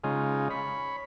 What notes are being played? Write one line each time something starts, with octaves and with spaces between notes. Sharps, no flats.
C#3 G#3 D#4 F4
C#5 B5